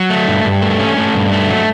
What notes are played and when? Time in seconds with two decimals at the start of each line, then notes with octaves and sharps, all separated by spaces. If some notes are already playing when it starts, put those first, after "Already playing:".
Already playing: F#3
0.10 A3
0.28 G2
0.44 G2
0.62 A3
0.79 C#4
0.97 A3
1.15 G2
1.32 A3
1.50 F#3